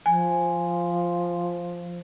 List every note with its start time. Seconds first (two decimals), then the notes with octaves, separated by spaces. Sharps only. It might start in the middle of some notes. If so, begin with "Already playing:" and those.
0.06 F3 G#5